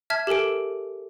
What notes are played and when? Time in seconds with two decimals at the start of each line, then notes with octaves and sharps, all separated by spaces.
0.10 E5 A5 F6 G#6 B6
0.27 G4 A4 A#4 G#5 D7